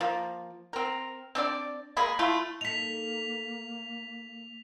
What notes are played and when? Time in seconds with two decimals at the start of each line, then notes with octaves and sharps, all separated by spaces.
0.01 F3 A#3
0.73 C4 A#4
1.35 C4 D4 D5
1.97 G#3 A#3 G#4 B5
2.19 A3 E4 F4
2.61 A#3 D#4 A4 B6 F7